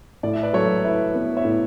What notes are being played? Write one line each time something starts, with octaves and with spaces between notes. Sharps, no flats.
A2 D5
E5
B4 D5
F#3 A4 C#5
E4 B4
B3 B4
C#5 E5
A2